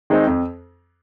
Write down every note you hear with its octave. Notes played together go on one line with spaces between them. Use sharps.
D#3 G#3 C4 D#4
F2